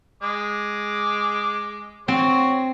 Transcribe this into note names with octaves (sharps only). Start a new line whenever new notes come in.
G#3 D6
C4 F#4 C#5 C6